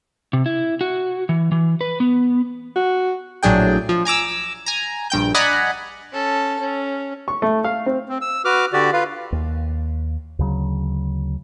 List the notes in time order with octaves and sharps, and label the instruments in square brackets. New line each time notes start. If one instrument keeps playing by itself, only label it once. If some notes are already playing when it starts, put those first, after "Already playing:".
[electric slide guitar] C3
E4
F#4
E3
E3
B4
B3
[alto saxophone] F#4
[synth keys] A#1 A2 F#3 D4 G#4 G5
F3
G#5 A#5 D6 E6
G#5 A#5
A#1 G2 G5 G6
D5 D#5 F#5 G#5 A#5 B5
[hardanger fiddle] C#4 A4
C#4
[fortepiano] C#6
A3
F5
C4
[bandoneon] C4
E6
F#4 B4 D6 F6
D3 F#4 G4 D5
F4 B4 F5
[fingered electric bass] D#2
D2 C#3 F#3